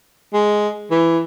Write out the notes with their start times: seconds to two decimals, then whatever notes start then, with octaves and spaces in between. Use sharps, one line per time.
0.34 G#3
0.91 E3